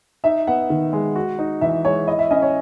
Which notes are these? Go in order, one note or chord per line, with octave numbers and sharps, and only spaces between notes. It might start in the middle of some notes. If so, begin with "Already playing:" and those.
D#4 E5
B3 F#5
D#3
G#3
F#4
D#4
E3 E5
G#3 C#5
E4 D#5
E5
C#4 D#5
C#5